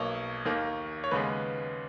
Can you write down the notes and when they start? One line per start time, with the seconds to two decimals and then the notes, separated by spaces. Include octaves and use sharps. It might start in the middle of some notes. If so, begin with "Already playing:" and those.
Already playing: B1 B2 A#3 C#5
0.45 D#2 D#3 A#3
1.04 C#5
1.11 D#2 C#3 G#3 B3 B4